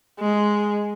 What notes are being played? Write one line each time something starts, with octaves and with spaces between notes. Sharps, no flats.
G#3